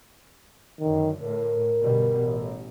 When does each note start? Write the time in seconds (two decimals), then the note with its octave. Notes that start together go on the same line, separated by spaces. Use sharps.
0.80 F#2 D3 D#3
1.22 A2 A#4
1.80 G1 B2 G3
2.21 A1